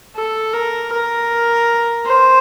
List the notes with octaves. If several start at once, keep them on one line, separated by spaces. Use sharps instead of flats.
A4
A#4
A#4
C5